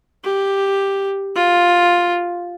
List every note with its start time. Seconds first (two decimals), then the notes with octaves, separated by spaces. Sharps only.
0.24 G4
1.35 F4